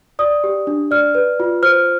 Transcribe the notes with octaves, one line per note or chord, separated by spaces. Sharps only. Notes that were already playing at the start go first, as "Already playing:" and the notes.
D5 D#6
G4
D4
D5 F6
B4
F4
C5 F6